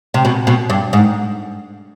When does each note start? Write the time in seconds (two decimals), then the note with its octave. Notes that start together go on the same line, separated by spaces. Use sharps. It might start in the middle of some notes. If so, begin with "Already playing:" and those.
0.14 C3
0.25 B2
0.47 B2
0.70 G2
0.93 G#2